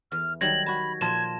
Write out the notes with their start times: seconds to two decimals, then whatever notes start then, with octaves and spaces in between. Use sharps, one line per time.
0.12 E2 F6
0.41 D#3 F#3 G3 G#6 A#6 F#7
0.66 F#4 A5 B5
1.01 A#2 F3 A5 C6 G#6 E7